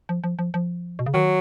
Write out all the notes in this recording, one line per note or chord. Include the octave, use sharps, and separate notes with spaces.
F3
F3
F3
F3
B2
C#3
D#3 F#3